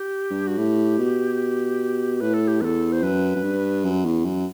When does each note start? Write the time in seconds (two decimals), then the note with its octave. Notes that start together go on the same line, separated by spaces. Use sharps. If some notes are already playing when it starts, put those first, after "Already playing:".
Already playing: G4
0.30 G2
0.47 F#4
0.57 A2 G4
0.98 B2
2.21 A2 B4
2.34 A4
2.48 G4
2.61 E2 A4 B4
2.92 C5
3.02 F#2 B4
3.35 F#2
3.43 G2
3.84 F#2
4.05 E2
4.25 F#2